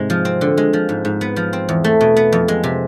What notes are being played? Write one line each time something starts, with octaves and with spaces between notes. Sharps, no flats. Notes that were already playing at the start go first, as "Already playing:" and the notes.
Already playing: G#2 C3 G#3
F3
C4
D3
G#3
F3
G#2
G#2
B3
F3
C4
E2
A3
B2
B3
F2
G#3
C3